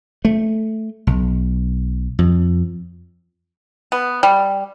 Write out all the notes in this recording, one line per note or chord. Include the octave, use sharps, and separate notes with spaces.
A3
B1
F2
B3
G3